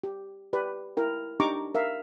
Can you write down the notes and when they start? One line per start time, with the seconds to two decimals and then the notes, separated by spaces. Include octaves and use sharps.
0.04 G4
0.53 G4 B4 D5
0.97 E4 A#4 G5
1.40 D4 D#4 G4 A#5 C#6 D6
1.75 A#4 E5 F5